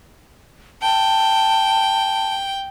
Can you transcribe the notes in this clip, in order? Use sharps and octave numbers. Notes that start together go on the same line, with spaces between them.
G5 A5